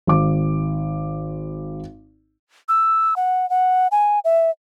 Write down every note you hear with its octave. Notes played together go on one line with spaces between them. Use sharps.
G#1 D6
E6
F#5
F#5
G#5
E5